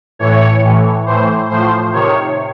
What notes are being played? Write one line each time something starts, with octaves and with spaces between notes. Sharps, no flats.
A2 E3 C#5
A2 E3
A2 E3 C5
A2 F3 C5
C3 D#3 C#5